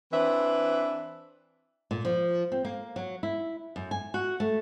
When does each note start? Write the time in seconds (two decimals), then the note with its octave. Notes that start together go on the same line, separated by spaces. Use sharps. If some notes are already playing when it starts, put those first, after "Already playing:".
0.12 E3 C4 D4 B4 E5
1.91 A#2
2.05 F3
2.52 C4
2.65 A#3
2.96 F#3
3.23 E4
3.76 F#2
3.91 G#5
4.14 F#4
4.40 A3